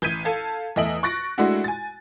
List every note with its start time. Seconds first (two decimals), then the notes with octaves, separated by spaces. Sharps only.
0.02 A1 G6 G#6 B6 D#7
0.25 A4 F5 A5 G#6
0.76 E2 A3 D#5 E5 D7 F#7
1.03 C#6 F#6 A6 A#6 D7
1.38 G#3 A3 D4 E4 F#4
1.64 G#5 A6